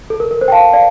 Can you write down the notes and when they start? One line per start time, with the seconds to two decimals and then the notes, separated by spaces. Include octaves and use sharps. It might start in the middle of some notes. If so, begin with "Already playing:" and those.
0.10 A4
0.20 A#4
0.31 A#4
0.41 C5
0.48 G5
0.52 F5 A5
0.73 D5 F5